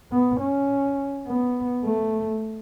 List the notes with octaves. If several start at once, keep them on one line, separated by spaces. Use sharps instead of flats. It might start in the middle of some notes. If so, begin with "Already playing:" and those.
B3
C#4
B3
A3